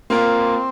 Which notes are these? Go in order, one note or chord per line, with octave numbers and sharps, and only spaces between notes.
A#3 C4 F4 A#4